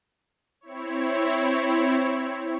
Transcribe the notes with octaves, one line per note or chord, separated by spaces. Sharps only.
C4 E4 C#5